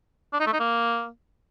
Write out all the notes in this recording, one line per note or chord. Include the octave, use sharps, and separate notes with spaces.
D4
D#4
A3
D#4
A#3